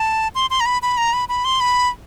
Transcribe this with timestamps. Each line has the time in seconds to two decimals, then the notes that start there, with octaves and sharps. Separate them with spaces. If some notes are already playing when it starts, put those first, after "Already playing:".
Already playing: A5
0.35 C6
0.50 C6
0.60 A#5
0.66 B5
0.82 B5
0.97 A#5
1.13 B5
1.29 B5
1.45 C6
1.60 B5